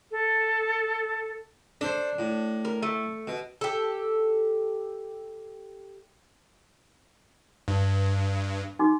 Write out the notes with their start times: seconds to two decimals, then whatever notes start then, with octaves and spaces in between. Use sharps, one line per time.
0.11 A4
1.81 D4 A4 C5
2.19 A2
2.65 A#4
2.82 A3
3.27 B2
3.61 G4 A4
7.68 G2
8.79 D#4 F#4 D6